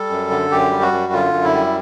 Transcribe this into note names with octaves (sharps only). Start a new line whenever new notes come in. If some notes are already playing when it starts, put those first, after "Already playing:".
Already playing: G3 A4
F#2
D3
F#2 G4
G3
F#4
F#2
D3 F4
F#2
E4
G3